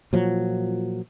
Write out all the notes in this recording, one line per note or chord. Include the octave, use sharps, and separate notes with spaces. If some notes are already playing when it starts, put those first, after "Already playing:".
A#2 F3 F#3